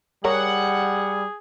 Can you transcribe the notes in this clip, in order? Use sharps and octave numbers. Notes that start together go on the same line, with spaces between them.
G3 G#4 A#4 C#5 F#5